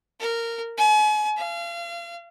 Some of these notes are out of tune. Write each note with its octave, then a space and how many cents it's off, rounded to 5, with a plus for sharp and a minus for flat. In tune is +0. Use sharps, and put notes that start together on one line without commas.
A#4 -15
G#5 +40
F5 -35